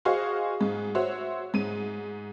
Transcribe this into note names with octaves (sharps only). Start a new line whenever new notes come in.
F#4 G#4 C5 D#5 F5 C#6
G#2
F#4 C5 C#5 E5 F#5
G#2 D#7